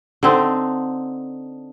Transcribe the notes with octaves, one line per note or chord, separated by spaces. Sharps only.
D3 C4 D#4